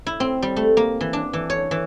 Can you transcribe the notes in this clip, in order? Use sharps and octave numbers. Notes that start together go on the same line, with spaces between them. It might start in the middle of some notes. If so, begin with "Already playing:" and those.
E4
C4
G3
A3
A#3
E3
D4
E3
C#5
E3